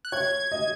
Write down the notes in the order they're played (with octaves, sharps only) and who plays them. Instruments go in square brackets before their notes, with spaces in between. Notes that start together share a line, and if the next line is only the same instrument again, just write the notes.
[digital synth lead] F#6
[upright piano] C#5 [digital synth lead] G#6
[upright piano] D#5